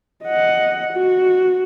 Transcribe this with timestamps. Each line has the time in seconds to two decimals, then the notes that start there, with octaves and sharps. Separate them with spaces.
0.24 D#5 F#5
0.93 F#4